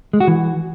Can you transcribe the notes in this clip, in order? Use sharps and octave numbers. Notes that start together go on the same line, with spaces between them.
G#3
F#4
E3